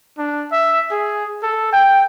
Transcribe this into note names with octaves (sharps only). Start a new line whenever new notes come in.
D4
E5
G#4
A4
G5